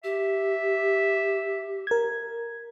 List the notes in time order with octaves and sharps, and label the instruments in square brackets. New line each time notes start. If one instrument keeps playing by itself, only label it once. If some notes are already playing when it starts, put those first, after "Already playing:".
[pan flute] G4 [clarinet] E5
[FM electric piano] A#4 G#6